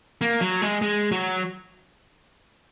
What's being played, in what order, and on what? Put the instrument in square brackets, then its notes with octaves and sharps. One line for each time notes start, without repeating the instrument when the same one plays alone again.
[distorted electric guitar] A#3
F#3
G#3
G#3
F#3